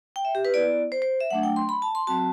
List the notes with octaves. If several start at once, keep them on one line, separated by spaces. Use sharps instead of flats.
G5
E5
G4
B4
B3 E4 D5
C5
C5
E5
F#3 A3 D4 F#5
G5
C6
B5
A5
C6
F#3 C4 F#4 A5